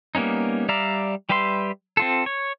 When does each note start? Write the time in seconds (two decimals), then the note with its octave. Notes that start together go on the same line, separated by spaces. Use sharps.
0.15 G3 A#3 B3 C#4 D#4
0.69 G3 D5 E5 F5 A#5
1.29 G3 G4 B4 E5 C6
1.97 C4 F4 A4
2.26 C#5